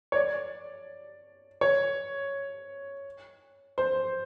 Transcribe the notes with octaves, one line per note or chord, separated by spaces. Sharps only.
C#5
D5
C#5
C5